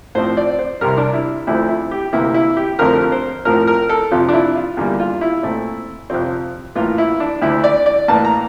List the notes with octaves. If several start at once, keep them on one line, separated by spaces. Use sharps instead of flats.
A2 F3 C4 C5
D5
C5
C2 C3 G3 A#4
D4
E4
D2 D3 F3 A3 C4 E4
E4
G4
D2 C3 E3 A#3 E4
E4
G4
F2 D3 F3 A3 C4 A#4
C5
A2 F3 C4 A#4
A#4
A4
F2 C3 F3 F4
D4
E4
F4
E2 D3 G3 A#3
F4
E4
A#2 A3 C4
F2 C3 F3 C4
A2 E3 A#3 F4
E4
D4
D2 D3 A3 E4
D5
D5
A2 E3 A#3 A5
A#5